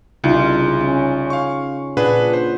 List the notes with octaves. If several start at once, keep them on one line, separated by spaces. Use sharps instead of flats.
C2 C#3 D#4 F4
C#4
F5 C#6
A#2 D4 G#4 B4 F#5
C5